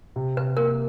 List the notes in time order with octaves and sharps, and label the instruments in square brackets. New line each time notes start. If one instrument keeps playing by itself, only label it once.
[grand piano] C3
[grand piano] C3 [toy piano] B4
[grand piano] A#3 [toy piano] A#4